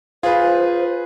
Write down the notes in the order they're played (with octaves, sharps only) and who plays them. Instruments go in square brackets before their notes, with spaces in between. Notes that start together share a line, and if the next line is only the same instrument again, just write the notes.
[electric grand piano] F4 [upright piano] G#4 B4 [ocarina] C5 [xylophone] F5